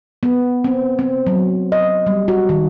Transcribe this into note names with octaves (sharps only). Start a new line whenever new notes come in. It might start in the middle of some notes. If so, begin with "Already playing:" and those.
B3
C4
C4
F#3
D#5
G3
F#4
D#3